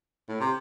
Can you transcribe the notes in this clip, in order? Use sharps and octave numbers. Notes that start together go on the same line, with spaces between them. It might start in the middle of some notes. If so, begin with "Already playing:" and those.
A2
C3